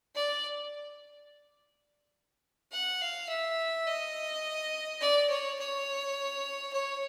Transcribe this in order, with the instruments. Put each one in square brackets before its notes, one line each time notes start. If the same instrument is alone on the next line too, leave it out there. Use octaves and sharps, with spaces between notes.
[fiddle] D5
F#5
F5
E5
D#5
D5
C#5
C#5
C#5